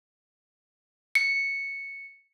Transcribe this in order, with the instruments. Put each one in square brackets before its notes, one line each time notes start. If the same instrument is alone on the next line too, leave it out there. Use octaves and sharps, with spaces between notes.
[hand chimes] C#7